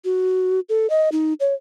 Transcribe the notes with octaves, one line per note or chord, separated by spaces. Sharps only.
F#4
A4
D#5
D#4
C#5